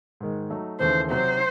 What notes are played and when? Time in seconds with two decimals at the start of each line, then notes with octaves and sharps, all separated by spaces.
0.20 G#2 D#3 G#3
0.50 F#3 A3 D#4
0.80 D#2 C#3 E3 A3 C5
1.09 C3 F#3 C4 F#4 C5